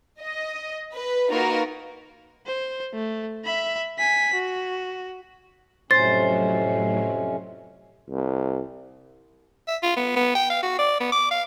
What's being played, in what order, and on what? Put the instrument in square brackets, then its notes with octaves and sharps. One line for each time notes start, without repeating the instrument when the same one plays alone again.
[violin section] D#5
B4
A#3 D#4 F4 F#4 A#4 B4
[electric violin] C5
A3
E5 B5
G#5 B6
F#4
[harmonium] F2 C3 C#4 [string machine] A2 F#3 [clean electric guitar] C5 [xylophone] A6
[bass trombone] C2
[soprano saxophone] E5
F4
B3
B3
G5
F5
F#4
D5
B3
D6
F5